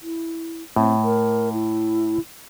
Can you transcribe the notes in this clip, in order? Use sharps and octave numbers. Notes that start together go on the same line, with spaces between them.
E4
A2 C4
A#4
E4